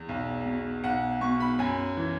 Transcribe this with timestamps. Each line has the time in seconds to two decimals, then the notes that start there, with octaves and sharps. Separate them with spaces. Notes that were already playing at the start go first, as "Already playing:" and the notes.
Already playing: E2
0.09 B1
0.46 B2
0.84 B1 F#5
1.21 B2 C#6
1.40 B5
1.59 F#2 G#5
1.97 E3